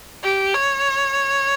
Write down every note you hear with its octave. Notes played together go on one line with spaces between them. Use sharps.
G4
C#5